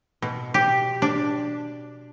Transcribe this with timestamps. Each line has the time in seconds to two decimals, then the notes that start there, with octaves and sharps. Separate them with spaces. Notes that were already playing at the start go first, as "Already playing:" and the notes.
0.22 B2
0.54 G4
1.02 D4